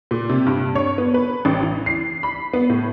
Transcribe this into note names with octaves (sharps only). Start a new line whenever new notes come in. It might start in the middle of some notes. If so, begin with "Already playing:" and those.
A#2
C3
G2
C#5
B3
B4
A1
E3
C7
B5
B3
A2